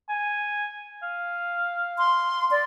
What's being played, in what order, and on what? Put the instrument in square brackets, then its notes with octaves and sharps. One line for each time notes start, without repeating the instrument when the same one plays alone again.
[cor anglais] G#5
F5
[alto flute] C6
D5